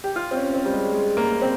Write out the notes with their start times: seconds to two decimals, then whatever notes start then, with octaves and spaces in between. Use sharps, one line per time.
0.04 G4
0.16 F4
0.31 C4
0.35 C#4
0.54 C4
0.65 G3
0.72 G#3
0.92 G#3
1.17 A#3
1.42 C4